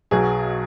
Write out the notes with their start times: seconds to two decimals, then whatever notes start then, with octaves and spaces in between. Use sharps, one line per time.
0.11 B1 B2 F#3 G#4